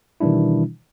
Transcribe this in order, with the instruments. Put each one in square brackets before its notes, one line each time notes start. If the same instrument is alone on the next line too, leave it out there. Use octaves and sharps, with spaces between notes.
[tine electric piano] B2 D#3 E3 G3 D4 E4